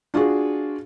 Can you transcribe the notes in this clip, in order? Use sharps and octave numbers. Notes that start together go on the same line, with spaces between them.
D4 F4 F#4 G#4